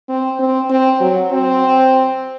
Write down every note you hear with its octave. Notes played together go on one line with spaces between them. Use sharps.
C4
C4
C4
F#3
C4